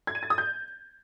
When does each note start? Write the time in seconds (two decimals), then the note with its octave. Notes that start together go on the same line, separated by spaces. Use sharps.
0.07 G#6
0.15 D#7
0.23 A6
0.30 D#6
0.38 G6